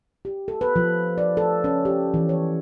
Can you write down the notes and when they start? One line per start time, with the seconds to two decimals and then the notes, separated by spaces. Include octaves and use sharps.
0.25 G4
0.48 A4
0.61 B4
0.76 F3
1.18 D5
1.37 A4
1.64 C#4
1.85 G4
2.14 E3
2.29 C#5